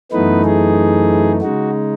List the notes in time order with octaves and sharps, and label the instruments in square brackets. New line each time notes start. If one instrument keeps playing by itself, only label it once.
[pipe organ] F#2 E3 A3 B3 D#4 B4
G#4
C#3 G#3 D#4 F#4